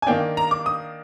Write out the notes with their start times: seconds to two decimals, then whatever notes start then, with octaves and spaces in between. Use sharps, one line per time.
0.02 G#5
0.06 D#3 A#3 D4 G5
0.37 A#5
0.51 D6
0.66 D#6